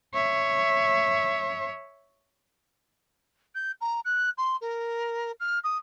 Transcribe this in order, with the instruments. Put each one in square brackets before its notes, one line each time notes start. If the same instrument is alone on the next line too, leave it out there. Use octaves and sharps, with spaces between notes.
[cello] C#5 E5
[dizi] G6
A#5
F#6
C6
A#4
F6
D#6